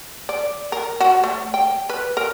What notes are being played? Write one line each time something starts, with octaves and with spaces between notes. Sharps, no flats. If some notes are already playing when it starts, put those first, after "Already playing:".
D5
A#4
F#4
A3
G5
B4
A#4